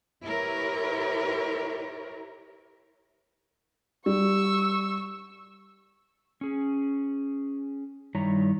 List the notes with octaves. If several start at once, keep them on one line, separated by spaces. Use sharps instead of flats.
E4 G4 A#4 B4 C#5
G3 C#6 E6
C#4 G#4
G2 D#3 G3 E4 C#5 A#5